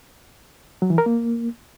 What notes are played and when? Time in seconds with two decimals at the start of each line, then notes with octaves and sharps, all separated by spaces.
0.82 F#3
0.90 E3
0.98 A#4
1.06 A#3